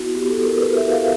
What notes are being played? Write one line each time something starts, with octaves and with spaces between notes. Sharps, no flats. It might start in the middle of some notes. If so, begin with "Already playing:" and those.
Already playing: B3 E4 F#4
B3 G4
A4
E4
A#4
B3 B4
E5
E4
F5